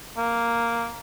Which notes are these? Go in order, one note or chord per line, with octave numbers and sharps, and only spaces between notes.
A#3